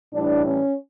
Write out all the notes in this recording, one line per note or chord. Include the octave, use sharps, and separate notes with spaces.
A2 E3 G3 D4
C#4